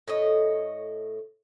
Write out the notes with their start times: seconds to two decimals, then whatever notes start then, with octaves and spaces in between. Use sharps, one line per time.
0.08 A2 C#5 D#5